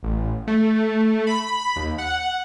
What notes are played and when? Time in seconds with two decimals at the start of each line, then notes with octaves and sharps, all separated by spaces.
0.03 A1
0.47 A3
1.27 B5
1.76 D#2
1.98 F#5